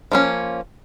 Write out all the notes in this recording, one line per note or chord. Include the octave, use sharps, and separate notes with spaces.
F3 A#3 C#4